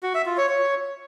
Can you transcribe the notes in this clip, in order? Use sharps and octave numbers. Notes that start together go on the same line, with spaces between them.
F#4
E5
F4
C#5
C#5